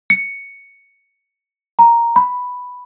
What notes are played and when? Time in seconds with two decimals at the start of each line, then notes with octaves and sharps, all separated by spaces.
0.10 C#7
1.79 A#5
2.16 B5